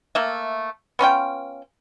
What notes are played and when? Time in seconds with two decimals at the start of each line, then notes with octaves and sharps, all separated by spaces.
0.15 A3 A#3 E5
0.99 B3 C#4 F4 G5